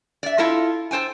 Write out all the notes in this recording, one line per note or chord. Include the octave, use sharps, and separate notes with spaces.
D5 E5
E4 F4 A4 D#5
A4 C5 G5 G#5